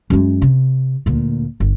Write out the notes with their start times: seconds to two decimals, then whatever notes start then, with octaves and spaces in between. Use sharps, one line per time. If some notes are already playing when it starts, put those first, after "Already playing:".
0.10 F#2 G#3
0.42 C3
1.06 D2 A#2
1.60 G1